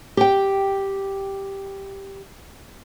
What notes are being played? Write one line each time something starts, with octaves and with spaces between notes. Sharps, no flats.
G4 G5